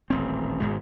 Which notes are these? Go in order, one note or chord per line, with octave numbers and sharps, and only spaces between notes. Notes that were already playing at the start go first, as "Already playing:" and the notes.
D#1 A1 C4
G#1 G#2 B2 G#3